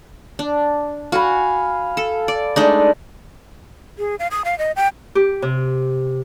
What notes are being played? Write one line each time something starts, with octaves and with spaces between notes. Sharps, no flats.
D4
F#4 F5 G#5 B5
A4
D5
G#3 A3 D4 D#4 D5
G#4
F5
D#6
F5
D#5
G5
G4
C3